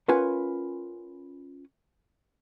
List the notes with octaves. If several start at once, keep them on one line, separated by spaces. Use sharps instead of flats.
C#4 F4 A#4 B4 F#5 G#5